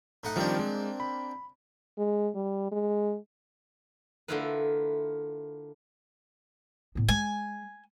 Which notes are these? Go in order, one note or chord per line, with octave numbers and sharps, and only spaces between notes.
A2 D#4 F#5
D#3 F3 G3 A#3 C4 D4
G#3
B5
G#3
G3
G#3
D3 A3 E4 F4 A#4 B4
A2 B3
G#3 G#5